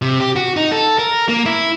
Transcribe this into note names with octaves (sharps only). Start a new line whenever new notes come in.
C3
G4
F#4
D#4
A4
A#4
A#3
E4